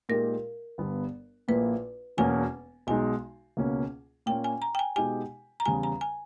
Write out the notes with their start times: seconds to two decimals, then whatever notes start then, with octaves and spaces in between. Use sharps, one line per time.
0.09 A#2 G#3 D#4 G4 A#4
0.78 G1 G2 G3 B3
1.48 A#1 A#2 A#3 E4 B4
2.17 E1 E2 B2 A#3 C#4 G#5
2.87 B1 B2 G#3 D#4 G#5
3.57 C#2 B2 A#3 C#4
4.26 A#2 A#3 C#4 G5
4.44 G#5
4.62 A#5
4.75 G5
4.79 G#5
4.96 B2 G#3 D#4 G4 G#5
5.60 A#5
5.66 E2 C#3 G3 G#5
5.83 A#5
6.01 G#5